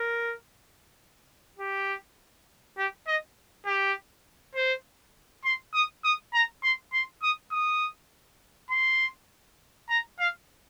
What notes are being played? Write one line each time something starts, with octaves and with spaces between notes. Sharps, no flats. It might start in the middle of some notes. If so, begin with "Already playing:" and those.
Already playing: A#4
G4
G4
D#5
G4
C5
C6
D#6
D#6
A#5
C6
C6
D#6
D#6
C6
A#5
F5